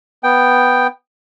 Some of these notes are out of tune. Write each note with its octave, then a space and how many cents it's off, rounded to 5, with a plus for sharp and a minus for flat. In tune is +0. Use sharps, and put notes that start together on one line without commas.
B3 +0 G5 +0